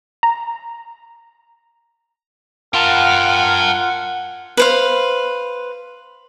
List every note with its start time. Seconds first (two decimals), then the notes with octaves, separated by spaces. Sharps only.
0.23 A#5
2.74 F4 A#4 F#5 G5 A5
4.57 B4 C5 F5